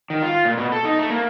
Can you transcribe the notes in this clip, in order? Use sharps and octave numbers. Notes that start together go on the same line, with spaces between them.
D#3
F4
A#2
B2
A4
D#4
A3
A#3